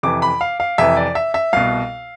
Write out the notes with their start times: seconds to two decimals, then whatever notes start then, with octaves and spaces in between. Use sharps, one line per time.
0.03 F2 C3 E3 D6
0.22 B5
0.41 F5
0.60 F5
0.78 F2 C3 E3 E5
0.97 D5
1.15 E5
1.34 E5
1.53 C2 B2 F5